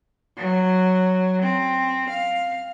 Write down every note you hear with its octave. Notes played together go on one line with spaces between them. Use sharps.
F#3
C4
F5